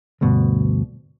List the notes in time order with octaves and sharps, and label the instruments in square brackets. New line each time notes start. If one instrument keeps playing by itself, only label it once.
[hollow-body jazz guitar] D2 G2 B2